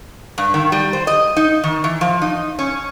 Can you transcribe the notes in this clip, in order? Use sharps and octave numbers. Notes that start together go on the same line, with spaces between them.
G2
D#3
G3
C5
D#5
D#4
D#3
E3
F3
D#4
C#4